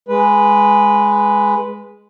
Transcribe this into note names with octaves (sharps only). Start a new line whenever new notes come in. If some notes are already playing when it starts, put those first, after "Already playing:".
G#3 B4